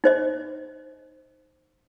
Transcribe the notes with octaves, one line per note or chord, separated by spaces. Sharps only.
D#4 C5 D#5